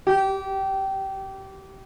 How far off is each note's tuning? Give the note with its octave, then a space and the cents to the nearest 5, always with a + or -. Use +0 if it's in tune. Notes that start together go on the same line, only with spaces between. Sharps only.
G4 -20